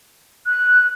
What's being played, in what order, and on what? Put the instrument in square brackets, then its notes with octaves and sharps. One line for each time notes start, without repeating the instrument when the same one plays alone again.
[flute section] F#6